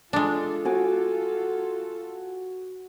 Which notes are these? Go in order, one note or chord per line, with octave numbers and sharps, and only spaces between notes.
G#3 D4 F4 A4
F#4 G#5 D6